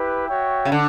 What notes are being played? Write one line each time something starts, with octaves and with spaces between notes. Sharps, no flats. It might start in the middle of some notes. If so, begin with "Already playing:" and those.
Already playing: E4 G4 B4
F#4 C#5 E5 G5
C#3
D3